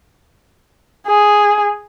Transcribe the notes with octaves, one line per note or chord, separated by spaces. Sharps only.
G#4